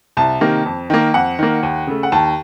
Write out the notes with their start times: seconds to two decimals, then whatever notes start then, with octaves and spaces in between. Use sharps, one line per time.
0.17 C2 A5
0.41 C3 D#3 A#3
0.66 F2
0.90 D#3 A#3
1.14 F2 F#5
1.39 D#3 A#3
1.63 D#2
1.87 C#3 A3
2.03 F#5
2.12 D#2 A5